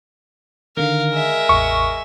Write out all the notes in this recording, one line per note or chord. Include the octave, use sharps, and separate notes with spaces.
D3 D#3 A#4 F5
G#3 E5
A1 E2 C#6